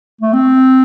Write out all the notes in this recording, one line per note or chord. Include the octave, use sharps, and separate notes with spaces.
A3
C4